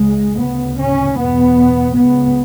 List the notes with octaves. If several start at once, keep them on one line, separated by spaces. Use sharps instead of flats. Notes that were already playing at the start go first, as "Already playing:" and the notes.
Already playing: C#2 C#3 G#3
D2 C#3 B3
C#4
E2 B2 B3
C#2 C#3 B3